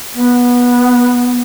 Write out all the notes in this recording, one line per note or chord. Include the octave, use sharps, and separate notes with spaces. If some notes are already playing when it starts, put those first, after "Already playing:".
B3